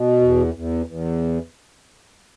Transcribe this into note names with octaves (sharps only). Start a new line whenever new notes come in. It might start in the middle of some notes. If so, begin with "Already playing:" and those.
Already playing: B2
E2
E2
E2